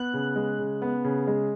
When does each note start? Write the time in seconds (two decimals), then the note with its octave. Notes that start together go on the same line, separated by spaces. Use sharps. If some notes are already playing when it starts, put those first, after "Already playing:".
Already playing: B3 F#6
0.14 C#3
0.36 G#3
0.59 C#3
0.82 B3
1.04 C#3
1.27 G#3